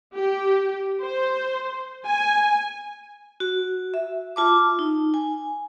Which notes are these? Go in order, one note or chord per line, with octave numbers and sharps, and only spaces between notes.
G4
C5
G#5
F#4
E5
F4 A5 D6
D#4
G#5